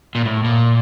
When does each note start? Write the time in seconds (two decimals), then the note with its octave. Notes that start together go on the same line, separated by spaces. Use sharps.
0.15 A#2
0.25 A2
0.44 A#2